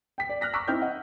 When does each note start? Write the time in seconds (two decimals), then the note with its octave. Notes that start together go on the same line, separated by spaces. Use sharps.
0.18 G5 B6
0.29 D5
0.41 F6 F#6 A#6 B6
0.54 A#5 C#6 D6 E6 F#6 B6
0.68 C4 D#4 E4 G5 F6 G6
0.82 D#5 F#5